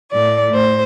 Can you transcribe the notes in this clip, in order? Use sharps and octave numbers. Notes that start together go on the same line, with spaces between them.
A2 A3 D5
A2 C5